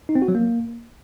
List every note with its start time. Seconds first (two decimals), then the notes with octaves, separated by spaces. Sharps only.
0.09 D#4
0.15 C4
0.22 F#4
0.28 F#3
0.35 A#3